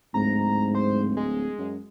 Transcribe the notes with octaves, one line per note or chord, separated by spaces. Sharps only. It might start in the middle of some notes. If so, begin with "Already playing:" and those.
D1 G#2 A#5
C5
G#3
F#2